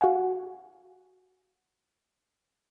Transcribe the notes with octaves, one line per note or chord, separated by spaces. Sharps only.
F#4 F5 F#5 G#5